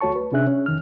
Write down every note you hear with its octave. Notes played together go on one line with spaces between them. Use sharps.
D2 A3 F#4 C#5 A5 C#6
B4
C3 C#4 D4 G#4 E5 F#6
C#4
F2 D#3 F6